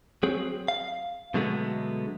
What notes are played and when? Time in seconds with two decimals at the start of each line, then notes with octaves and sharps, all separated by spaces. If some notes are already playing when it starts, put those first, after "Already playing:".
0.23 F#3 C4 G#4
0.68 F5
1.34 B2 D3 F#3 G#3 A3 B3